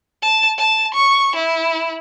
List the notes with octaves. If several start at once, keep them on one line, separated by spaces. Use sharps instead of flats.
A5
A5
C#6
E4